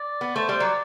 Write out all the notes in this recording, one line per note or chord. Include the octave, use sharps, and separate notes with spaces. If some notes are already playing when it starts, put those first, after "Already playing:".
Already playing: D5
B3
A3 C5
G3 C5
F#3 D5